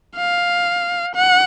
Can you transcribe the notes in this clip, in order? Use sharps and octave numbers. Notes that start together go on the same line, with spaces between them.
F5
F#5